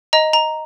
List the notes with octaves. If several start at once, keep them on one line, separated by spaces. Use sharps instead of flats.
D#5 A#5
A#5